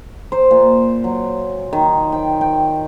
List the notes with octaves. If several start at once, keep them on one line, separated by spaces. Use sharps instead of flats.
C5
A#2
F#3
D#3
G5
G5